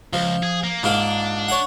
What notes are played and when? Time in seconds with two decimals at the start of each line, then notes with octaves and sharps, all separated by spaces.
0.13 C#2 F3
0.43 G#4
0.64 A#3
0.83 G#2 A#3 D4 F4
1.48 C#5 F#5